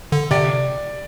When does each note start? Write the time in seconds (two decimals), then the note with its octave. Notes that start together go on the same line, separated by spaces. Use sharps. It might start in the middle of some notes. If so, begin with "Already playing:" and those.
0.12 D3
0.31 C3 D5